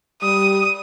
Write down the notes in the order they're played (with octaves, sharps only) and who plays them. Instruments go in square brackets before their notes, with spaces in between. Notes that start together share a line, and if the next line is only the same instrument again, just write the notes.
[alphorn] G3 [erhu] D#6